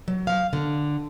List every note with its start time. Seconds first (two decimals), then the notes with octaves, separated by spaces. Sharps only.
0.08 F#3
0.27 F5
0.53 D3